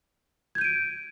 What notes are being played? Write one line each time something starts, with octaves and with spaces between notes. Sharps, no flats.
G6 G#6 D7 D#7